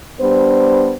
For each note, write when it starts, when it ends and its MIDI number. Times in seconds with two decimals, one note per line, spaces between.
0.20 0.93 55
0.20 0.93 59
0.20 0.93 62
0.20 0.93 72